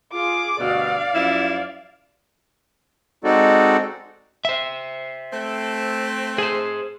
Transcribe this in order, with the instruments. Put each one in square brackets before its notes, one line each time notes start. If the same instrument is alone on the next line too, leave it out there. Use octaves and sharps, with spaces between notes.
[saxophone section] F4 [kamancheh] G#4 D6
[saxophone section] D2 G2 B2 [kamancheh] D5 F5
[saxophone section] F#2 F3 E4
[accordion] G#3 C4 D#4 F#4 A4 D5
[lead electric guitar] C5 E5
[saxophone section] A3 C4 A4
[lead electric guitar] G#4 C5